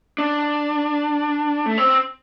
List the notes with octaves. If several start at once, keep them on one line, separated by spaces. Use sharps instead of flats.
D4
A3
C4